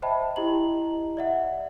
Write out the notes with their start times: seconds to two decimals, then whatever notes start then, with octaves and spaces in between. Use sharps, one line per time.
0.02 C5 D#5 E5 G5 A5 B5
0.36 E4 G4 D#5 A#5 F#7
1.17 D5 E5 F#5